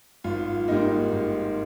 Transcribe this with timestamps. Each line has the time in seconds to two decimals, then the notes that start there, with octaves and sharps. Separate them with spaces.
0.24 G#1 F4
0.68 G#2 G3 A#3 D#4
1.12 G#1